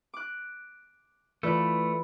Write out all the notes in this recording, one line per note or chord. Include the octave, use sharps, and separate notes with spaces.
D6 F#6
E3 A3 F4 B4 D5